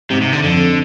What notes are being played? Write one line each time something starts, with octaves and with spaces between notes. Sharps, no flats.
G#2 C3
C3
D3
F2 D3